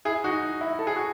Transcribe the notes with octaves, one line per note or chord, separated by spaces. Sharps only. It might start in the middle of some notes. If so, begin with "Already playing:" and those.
E4 G#4
D#4 F#4
E4
A4
G#4
F#4